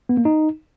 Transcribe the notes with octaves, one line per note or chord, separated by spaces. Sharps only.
B3
A#3
D#4